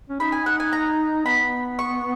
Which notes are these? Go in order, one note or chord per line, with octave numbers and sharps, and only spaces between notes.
C#4
D#4 B5
G#5
F#5
G#5
A#5
B3 B5
C#6